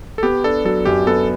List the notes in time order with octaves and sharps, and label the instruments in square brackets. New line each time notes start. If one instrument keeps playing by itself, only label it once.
[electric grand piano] A4
[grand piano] B3 [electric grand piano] G4
[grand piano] D4 [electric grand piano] A4
[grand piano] F#3 [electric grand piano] A4
[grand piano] F#2 [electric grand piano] G4
[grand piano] B3 [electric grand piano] A4